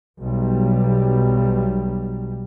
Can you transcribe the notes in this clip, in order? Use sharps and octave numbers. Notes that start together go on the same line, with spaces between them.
B1 G3